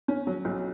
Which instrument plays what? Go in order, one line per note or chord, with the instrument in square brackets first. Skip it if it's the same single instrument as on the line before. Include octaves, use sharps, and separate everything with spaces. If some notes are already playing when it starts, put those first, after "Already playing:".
[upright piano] C#4
F#3
B1